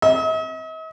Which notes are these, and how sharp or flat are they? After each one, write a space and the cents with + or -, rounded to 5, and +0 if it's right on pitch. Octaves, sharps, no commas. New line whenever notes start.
D#5 +45